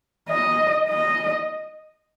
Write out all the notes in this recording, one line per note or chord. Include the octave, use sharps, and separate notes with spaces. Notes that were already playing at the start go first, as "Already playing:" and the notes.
D#5
D#5